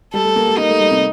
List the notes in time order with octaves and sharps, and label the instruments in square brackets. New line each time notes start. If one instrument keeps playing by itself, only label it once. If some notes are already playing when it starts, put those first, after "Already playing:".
[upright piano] G3 [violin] A4
[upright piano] A3
A#3
G3
[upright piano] A#3 [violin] D#4
[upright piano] A3
G3
C3